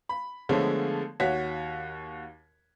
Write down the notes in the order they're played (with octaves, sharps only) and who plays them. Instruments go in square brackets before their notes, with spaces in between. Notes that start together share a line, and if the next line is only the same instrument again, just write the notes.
[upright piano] B5
D3 F3 G#3 A3 B3 C#5
D#2 F#4 C#5 B6